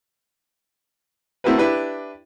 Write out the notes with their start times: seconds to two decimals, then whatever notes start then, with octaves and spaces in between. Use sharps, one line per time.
1.44 A3 C4 E4 F#4 A#4 B4
1.58 D4 E4 G4 B4